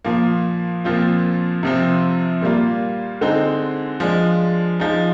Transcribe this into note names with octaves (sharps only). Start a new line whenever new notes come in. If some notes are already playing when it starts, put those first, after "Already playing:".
A#2 F3 A#3
A#2 F3 C4 F4
C3 F3 C4
A#2 G3 A#3 F4
D3 G#3 C4 D#4
F3 G#3 D4
F3 G#3 D#4